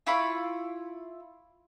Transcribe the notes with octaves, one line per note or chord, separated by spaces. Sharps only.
E4 F4 B5 C#6